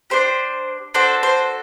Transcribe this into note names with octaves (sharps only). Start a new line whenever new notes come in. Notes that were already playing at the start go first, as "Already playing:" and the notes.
D4 G4 C5
D4 F#4 A4 C5
C5